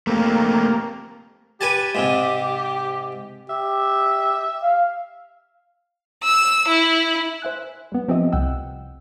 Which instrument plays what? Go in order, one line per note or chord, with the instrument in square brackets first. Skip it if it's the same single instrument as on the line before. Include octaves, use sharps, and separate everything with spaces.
[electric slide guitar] A3 C4 G4 [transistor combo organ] A#3
[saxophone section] G4 [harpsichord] B4 G#5 A5
[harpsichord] G#2 C3
[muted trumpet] G4 [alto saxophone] E5
[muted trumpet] F5
[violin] E6
E4
[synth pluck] C5 E5 G#5 F#6
G3 B3
F3 C4 G4 D#5 E5
C2 F#5 G5 E6